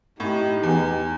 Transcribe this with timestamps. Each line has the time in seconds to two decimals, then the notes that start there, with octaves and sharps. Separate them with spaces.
0.20 A2 D#4 G4
0.63 E2